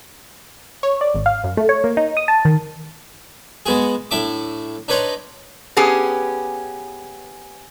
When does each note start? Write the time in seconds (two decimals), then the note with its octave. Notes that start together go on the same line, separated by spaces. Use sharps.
0.83 C#5
1.01 D5
1.15 G#1
1.26 F5
1.44 F#2
1.57 A3
1.69 C#5
1.84 A#3
1.97 D#4
2.17 D#6
2.28 A5
2.45 D#3
3.66 G#3 B3 F#4 G#4
4.11 A2 D4 E5 D6
4.88 D4 D#4 B4 C#5 A#5 C6
5.77 B3 C#4 G4 G#4